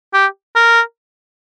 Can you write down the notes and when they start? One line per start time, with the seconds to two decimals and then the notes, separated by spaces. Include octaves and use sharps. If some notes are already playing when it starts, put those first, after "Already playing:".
0.13 G4
0.55 A#4